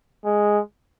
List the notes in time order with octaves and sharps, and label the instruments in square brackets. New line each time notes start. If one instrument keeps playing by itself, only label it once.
[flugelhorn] G#3